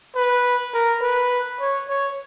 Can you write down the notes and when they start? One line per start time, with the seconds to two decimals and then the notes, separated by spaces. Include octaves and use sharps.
0.15 B4
0.73 A#4
1.01 B4
1.60 C#5
1.88 C#5